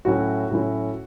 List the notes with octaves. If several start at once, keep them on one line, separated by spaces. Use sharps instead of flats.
A2 F#3 C#4 E4 F#4
A2 F#3 C#4 E4